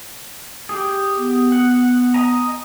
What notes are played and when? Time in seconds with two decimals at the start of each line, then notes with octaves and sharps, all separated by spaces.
0.69 G4 G#4
1.17 B3
1.52 F#5
2.14 D#5 G#5 A#5